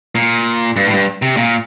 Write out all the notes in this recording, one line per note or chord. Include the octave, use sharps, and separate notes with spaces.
A#2
G2
A2
G2
C3
A#2